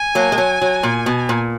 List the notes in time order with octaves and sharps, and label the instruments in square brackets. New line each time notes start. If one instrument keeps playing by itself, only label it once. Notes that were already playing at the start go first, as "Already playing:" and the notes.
Already playing: [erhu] G#5
[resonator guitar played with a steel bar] F#3 A#3
G#3
F#3
F#3
A#2
B2
A#2